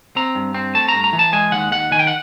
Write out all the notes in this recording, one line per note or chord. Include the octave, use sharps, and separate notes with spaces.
C4 A#5
G2
C4
A3 A5
A#5
G2
A#5
E3
A5
G#3 G#5
D#2 F#5
D#2 F#5
D#3 G#5
G5
F#5